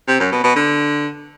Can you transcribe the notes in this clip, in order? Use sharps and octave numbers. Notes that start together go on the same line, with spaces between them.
C3
F#2
B2
B2
D3